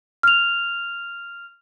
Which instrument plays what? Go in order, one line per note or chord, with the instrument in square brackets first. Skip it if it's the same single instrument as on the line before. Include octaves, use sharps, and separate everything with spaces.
[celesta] F6 F7